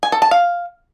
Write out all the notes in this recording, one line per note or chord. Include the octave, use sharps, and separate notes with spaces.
G#5
A4
A5
F5